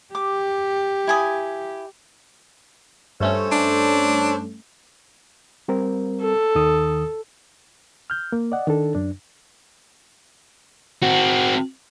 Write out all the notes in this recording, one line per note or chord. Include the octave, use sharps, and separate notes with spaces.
G4 D6
E4 G#5 D#6
G2 A3 C#4 A4 C5 C#5
D4
G3 C4 A#4
A4
D#2 D#3 D#6
F6 G6
A#3
D5 D#5 F#5
D#3 D4 A4
F#2 D4
C4 F#4